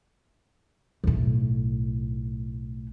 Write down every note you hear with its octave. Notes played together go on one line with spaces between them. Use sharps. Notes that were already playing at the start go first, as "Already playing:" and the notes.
B1 A2